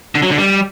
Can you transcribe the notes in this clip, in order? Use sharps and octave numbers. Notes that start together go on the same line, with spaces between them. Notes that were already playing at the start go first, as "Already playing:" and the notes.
D3
F#3
D3
G3